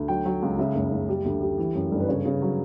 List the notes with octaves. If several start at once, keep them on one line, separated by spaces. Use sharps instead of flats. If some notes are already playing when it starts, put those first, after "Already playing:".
Already playing: D2
F#3 G5
F#3
C#2
C#3 E5
F#1
F#1
G3
D2
G3
E3
F#2
G1
B4
C#3 C#5
C#3
F#3